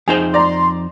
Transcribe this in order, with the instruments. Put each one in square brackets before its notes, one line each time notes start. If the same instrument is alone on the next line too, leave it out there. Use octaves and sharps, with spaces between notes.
[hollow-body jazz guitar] F2 D#4 C5 [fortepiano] G#4
[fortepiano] D5 A#5 [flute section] C6